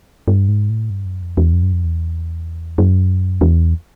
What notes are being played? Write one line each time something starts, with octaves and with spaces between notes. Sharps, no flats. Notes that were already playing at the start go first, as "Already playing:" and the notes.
G2
G#2
A2
G2
F#2
F2
E2
F2
F#2
F2
E2
F#2
E2